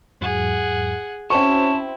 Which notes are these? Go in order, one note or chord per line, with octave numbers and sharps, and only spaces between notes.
E2 G#2 F#3 G#4 F#5
C4 C#4 E4 F#4 C5 G5 A5 C#6